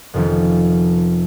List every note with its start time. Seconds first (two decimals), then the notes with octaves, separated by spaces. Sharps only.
0.13 F1 F2 D#3 F3 C#4